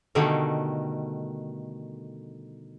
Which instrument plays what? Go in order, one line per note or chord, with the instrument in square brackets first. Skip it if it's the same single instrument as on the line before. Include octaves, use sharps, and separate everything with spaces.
[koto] B2 D3 D#3 G3 A3